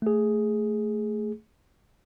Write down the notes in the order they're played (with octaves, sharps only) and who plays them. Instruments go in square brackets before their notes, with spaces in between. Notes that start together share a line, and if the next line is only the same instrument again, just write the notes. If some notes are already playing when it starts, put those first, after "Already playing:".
[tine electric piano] A3 G#4